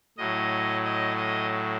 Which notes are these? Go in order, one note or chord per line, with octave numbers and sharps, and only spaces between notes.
A2 F#3 D#5
D#5
D#5